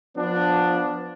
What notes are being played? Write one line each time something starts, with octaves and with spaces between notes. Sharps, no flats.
F3 B3 D4